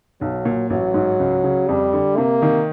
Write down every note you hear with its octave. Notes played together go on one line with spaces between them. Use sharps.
B1 F#3
A#2
A1 F#3
G#2
C#2
C#3
F2 G3
D3
C3 A#3
D#3